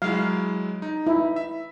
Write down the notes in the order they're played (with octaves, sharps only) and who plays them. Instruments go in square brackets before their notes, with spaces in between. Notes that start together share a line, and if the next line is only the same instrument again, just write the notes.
[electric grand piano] F#3 G#3 E4 [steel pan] F5
[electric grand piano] D#4
[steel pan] E4
[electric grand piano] E5